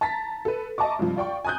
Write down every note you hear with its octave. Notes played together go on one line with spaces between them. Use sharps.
A5 A#5 A6 B6
A4 B4
D#5 E5 A5 A#5 C#6 D6
G2 C3 F3
F4 D5 G5 C#6
G#5 A#5 D#6 F#6 G6